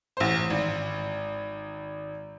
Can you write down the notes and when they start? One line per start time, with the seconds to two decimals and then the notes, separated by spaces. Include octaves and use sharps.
0.17 A1 C5
0.50 G#1